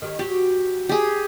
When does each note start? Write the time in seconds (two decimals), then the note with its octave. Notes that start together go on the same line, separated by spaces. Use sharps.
0.02 D#3 G4 C#5
0.19 F#3 F#4 G4
0.89 G4 G#4